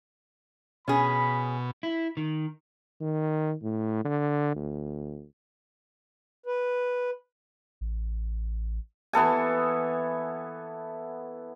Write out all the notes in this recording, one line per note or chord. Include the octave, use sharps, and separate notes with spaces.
B2 C#4 G#4 B5
E4
D#3
D#3
A2
D3
D2
B4
A1
E3 B3 A4 G#5